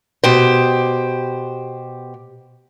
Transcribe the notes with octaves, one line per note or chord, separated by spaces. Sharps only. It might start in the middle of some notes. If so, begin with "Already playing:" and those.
B2 G4 C5